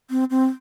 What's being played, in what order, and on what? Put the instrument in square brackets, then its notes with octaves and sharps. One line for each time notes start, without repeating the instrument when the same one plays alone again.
[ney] C4
C4